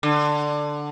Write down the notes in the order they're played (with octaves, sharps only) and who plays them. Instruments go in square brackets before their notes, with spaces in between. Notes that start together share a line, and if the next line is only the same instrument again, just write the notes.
[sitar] D3